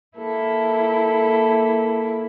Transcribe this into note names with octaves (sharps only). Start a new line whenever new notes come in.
A#3 E4 A4